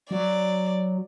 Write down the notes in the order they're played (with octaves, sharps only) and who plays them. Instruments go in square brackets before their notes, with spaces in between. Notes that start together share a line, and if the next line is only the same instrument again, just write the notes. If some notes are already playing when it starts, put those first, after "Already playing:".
[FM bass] F#3 [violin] D5